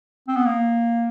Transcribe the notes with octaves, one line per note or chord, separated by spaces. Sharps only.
C4
B3
A#3